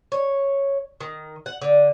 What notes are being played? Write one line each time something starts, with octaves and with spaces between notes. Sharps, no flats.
C#5
D#3
F#5
D3